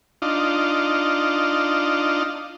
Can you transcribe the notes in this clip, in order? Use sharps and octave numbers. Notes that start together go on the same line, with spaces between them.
D4 D#4 F4